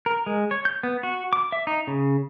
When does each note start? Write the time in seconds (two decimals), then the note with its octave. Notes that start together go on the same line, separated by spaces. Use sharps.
0.06 A#4
0.26 G#3
0.51 C#5
0.65 G6
0.83 B3
1.03 F#4
1.33 D6
1.52 E5
1.67 D#4
1.87 C#3